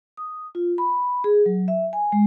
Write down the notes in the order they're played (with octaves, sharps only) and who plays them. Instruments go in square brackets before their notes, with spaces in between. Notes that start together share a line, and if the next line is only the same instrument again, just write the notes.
[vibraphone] D#6
F4
B5
G#4
F#3
E5
G#5
G#3